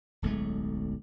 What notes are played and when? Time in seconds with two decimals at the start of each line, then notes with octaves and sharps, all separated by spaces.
0.22 D1 B1 G#3 A3